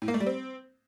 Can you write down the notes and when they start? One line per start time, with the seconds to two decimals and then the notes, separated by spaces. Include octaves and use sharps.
0.02 A2
0.08 A#3
0.14 A3
0.20 G3
0.26 C4